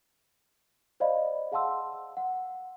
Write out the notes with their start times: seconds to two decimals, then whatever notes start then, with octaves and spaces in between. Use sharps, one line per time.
1.00 C5 D5 D#5 F5 B5
1.52 G#4 F5 F#5 A5 C6 E6
2.17 F#5